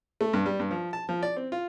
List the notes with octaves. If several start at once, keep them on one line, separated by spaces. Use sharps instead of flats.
A3
G2
G3
G2
F3
A5
F3
D5
C4
F4